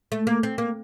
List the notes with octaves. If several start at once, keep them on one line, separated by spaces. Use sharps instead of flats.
A3
A#3
C4
A#3